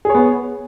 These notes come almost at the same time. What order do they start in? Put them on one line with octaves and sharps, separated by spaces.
G#4 C#5 B3